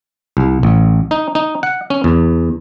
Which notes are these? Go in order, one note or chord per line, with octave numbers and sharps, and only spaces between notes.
C2
A1
D#4
D#4
F#5
C#4
E2